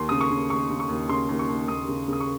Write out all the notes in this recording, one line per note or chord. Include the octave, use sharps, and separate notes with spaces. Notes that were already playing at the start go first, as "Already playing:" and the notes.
Already playing: D#2 C6
C#3 D#6
C#6
C#3
D#2 C#6
C#3
C#6
D#2
C#3 C6
D#2
C#6
D#2
D#2 D#6
C#3
C#3 D#6
C#6